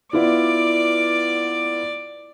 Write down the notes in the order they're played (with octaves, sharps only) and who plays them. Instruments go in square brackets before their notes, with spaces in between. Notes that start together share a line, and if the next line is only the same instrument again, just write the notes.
[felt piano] B3 E4 F4 [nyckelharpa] D5 D6